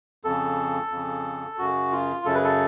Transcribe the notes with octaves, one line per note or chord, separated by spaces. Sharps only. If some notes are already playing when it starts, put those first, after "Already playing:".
F2 C#3 A4
F2 C#3
F#2 C#3 F#4
F4
F#2 C#3 A4
B4
A4